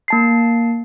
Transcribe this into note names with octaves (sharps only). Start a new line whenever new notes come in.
A#3 A5 C7